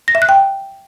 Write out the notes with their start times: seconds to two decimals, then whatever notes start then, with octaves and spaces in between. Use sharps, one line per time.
0.08 A#6
0.15 E5
0.22 F#6
0.29 G5